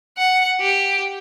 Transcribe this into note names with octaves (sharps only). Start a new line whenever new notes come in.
F#5
G4